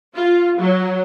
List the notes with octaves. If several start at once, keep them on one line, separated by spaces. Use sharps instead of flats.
F4
F#3